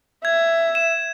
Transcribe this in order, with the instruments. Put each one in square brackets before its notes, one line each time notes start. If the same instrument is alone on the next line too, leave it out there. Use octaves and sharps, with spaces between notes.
[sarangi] E5 [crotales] G#6
[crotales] E7